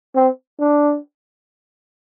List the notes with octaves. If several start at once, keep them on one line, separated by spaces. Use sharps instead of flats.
C4
D4